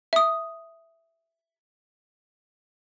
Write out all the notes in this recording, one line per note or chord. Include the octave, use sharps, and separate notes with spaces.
E5 D#6